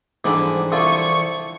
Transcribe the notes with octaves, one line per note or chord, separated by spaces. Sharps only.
G#2 D3 E3 F3 G3 D4
C2 D3 F4 C#6